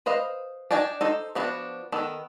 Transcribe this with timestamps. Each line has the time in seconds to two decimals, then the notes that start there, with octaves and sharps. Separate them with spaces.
0.06 B4 C5 D#5 F5
0.71 D4 D#4 D5 G5 G#5
1.01 D#4 A4 C5
1.35 F3 B3 D4 F#4
1.92 D#3 B3 A4